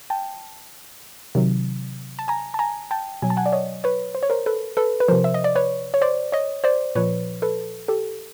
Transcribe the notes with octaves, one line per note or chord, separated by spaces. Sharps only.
G5 A5
C3 D#3 F#3
A5
G#5 A#5
A5
G#5 A#5
G5 A5
B2 F#3 G#5
A5
F#5 G#5
D5
C#5 D#5
B4 C#5
C5
C#5
A#4 C5
A4 B4
A4 B4
B4
C3 F3 A#4 C5
E5
D#5
D5
B4 C#5
C#5
C5 D5
C#5 D#5
C5 D5
A#2 F3 B4 C#5
A4 B4
G4 A4